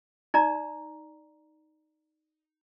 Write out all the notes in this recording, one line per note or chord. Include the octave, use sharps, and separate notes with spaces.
D#4 D5 A#5